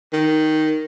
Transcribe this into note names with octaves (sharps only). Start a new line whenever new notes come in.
D#3